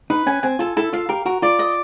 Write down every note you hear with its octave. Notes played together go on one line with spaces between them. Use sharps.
D#4 B4
C#4 G#5
C4 G#5
F4 A4
E4 A4
F4 F5
G4 A#4
F#4 A#4
F4 D5
D#5